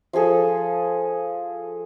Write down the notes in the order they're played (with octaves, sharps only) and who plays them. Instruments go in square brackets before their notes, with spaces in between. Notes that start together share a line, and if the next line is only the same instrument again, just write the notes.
[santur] F3 F4 G#4 A4